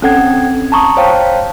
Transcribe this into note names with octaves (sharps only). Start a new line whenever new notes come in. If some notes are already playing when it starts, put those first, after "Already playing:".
C4 C#4 A4 F#5 G5 G#6
A5 A#5 C#6 D#6
C5 C#5 F5 G5 A5